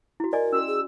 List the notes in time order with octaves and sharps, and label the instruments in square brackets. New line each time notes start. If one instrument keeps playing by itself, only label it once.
[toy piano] E4 F#4
[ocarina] A#4 [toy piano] D5 D#5 G#5
[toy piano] C#4 F#4 C6 [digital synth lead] E6
[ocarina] G#4